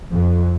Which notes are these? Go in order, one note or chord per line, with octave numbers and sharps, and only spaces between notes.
F2